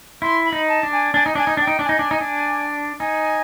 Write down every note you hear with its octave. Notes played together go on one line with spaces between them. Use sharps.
E4 C6
B5
D#4
A5
D4
G#5
D4 G#5
D#4
D4 G#5
D#4
D4 G5
D#4
D4
D#4 G#5
D4
D#4
D4
D#4 G#5